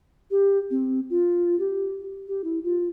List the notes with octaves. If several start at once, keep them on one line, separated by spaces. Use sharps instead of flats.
G4
C4
F4
G4
G4
E4
F4